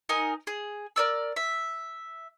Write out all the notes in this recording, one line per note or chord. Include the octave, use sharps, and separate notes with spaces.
D#4 A#4 G#5
G#4
A#4 D5 E6
E5